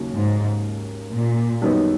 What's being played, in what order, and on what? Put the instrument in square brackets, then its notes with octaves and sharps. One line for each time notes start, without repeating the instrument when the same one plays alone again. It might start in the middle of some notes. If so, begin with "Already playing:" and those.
Already playing: [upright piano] D#2 C#3 F#3 A#3 D#4
[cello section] G#2
A#2
[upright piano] F#2 D#3 G3 B3 D#4